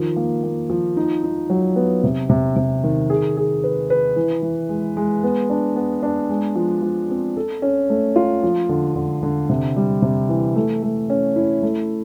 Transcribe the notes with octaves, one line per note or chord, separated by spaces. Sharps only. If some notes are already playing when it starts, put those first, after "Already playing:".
Already playing: D#3 F3
A#3
A#3
F3
D#4
D#4
F#3
B3
C3
C3
C3
D#3
G#4
G#4
B4
B4
E3
E3
G#3
G#3
B3
D4
B3
D4
G#3
F3
F3
C4
A4
C#4
A3
F4
F3
D3
D3
D3
C3
G3
C3
E3
A3
A3
C#4
E4
A3